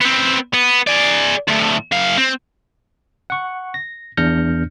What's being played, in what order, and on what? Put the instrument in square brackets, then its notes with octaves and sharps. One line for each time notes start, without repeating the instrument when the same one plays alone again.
[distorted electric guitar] B3 C4
B3
G#4 D5
D2 A2
F#2 F5
C4
[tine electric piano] F#5 C#6
A#6
E2 D4 F6 G6 A#6 C#7